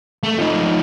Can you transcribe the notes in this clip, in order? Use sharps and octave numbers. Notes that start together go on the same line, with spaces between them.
A3
F3 D#4